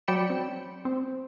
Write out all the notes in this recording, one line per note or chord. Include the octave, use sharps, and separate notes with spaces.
F#3 D5 G5 B5 C#7 E7
C4
C4